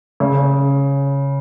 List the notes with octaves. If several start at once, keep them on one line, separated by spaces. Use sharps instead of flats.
C#3